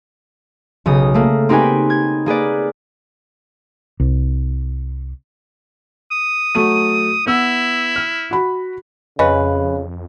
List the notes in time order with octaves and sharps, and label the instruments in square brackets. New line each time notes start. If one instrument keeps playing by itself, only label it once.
[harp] B1 C#3 D#6
A3 A#3
C4 D#4 G4 B4 G#5
G#6
A#3 G#4 B4 D5
[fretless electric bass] C2
[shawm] D#6
[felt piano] F#3 A3 D#7
[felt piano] B3 E6 [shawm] E4
[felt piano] F6
F#4 B5
[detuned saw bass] F2 [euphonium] C#3 [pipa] C#4 F4 B4 [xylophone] D#5